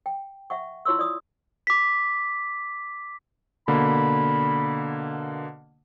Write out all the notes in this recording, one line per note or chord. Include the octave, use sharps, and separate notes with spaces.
G5
E5 F#5 C#6
E4 F4 C#5 C6 C#6 E6
F4 D5 D#6
D6 B6
B2 D3 A#3 B5